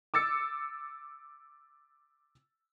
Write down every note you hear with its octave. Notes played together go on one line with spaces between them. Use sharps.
D6 E6 A6 C#7